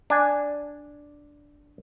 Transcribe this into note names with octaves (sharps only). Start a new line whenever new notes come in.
D4 G#5